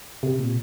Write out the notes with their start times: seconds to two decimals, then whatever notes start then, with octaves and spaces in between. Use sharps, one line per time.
0.23 C3
0.39 A#2